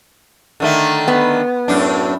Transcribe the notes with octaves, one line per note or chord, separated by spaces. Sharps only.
D3 D#3 A3
B3
F#2 A2 D4